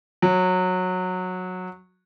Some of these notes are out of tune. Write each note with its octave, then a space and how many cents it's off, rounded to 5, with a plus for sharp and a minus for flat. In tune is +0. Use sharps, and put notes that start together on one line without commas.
F#3 -15